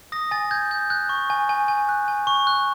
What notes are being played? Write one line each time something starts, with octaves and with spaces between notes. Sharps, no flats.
D#6 A#6
G#5 A6
G6 G#6
G6
F#6 G6
C#6
G#5
G#5
G#5
F#6
G#5
C#6
F#6